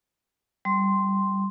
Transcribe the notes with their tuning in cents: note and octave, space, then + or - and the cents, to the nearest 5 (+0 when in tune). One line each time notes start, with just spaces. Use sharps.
G3 -10 C6 +0